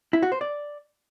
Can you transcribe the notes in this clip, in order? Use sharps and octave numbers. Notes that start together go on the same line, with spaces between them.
E4
F#4
C5
D5